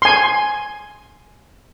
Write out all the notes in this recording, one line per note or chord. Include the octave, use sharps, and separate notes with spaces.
G#5 C6